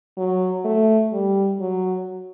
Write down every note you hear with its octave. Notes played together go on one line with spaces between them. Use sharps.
F#3
A3
G3
F#3